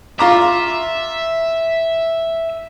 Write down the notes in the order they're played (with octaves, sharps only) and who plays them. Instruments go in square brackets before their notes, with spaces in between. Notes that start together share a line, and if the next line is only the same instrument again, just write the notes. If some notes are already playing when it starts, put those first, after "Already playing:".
[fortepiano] F4 A#5 D6 [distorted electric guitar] E5